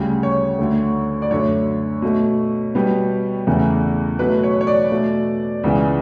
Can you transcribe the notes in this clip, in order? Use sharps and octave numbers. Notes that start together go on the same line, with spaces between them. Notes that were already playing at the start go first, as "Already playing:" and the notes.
Already playing: D2 C#3 G3
C#5
D2 D3 A3
D5
F#2 D3 A3 C#5
B2 A3
B2 G3 B3
E2 C#3 E3 A3
B2 F#3 A3 B4
C#5
C#5
D5
B2 A3
C#2 C#3 E3 B3